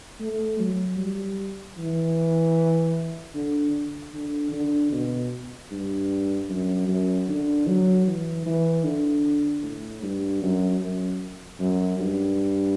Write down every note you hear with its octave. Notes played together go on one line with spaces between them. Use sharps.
A3
F#3
G3
E3
D3
D3
D3
B2
G2
F#2
F#2
D3
F#3
E3
E3
D3
A2
G2
F#2
F#2
F#2
G2